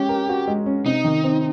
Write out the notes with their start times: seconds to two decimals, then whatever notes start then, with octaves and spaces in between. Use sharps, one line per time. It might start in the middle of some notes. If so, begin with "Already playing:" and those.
Already playing: G#3 C#4 G4
0.09 A#4
0.29 F#4
0.48 G#3
0.66 C#4
0.85 C3 D#4
1.04 D#3
1.24 C4